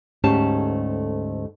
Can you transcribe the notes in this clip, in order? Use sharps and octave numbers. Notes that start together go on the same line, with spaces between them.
D2 G#2 A3 C#4 G4 A5